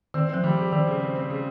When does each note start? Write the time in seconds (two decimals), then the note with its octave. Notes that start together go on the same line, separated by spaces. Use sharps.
0.14 D#3 C4
0.29 F3 C4
0.44 D#3 G3
0.58 G4
0.72 D#3 C4
0.87 C#3
1.01 C4
1.15 C4
1.30 C#3